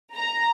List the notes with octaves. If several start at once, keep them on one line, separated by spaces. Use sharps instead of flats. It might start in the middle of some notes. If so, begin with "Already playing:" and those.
A#5